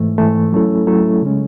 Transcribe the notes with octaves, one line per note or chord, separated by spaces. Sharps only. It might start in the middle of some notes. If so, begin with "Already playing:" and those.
Already playing: G#2 E3 A3
G#2 E3 A3
F#3 A3 C#4 E4 A4
F#3 A3 C#4 E4 A4
C#3 G#3 C#4